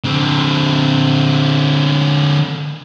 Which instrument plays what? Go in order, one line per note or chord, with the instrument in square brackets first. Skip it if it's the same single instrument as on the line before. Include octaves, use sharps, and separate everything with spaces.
[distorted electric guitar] D3 C4